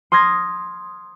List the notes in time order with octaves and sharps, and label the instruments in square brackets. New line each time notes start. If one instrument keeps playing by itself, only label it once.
[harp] C6 D#6 F6 G#6 A#6